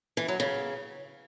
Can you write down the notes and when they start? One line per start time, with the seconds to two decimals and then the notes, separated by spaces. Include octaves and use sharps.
0.17 E3
0.28 F#3
0.40 C#3